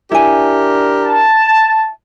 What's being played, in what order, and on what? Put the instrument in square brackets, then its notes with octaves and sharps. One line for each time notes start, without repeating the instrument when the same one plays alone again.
[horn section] D4 G4 A#4 [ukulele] E4 G#5
[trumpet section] A5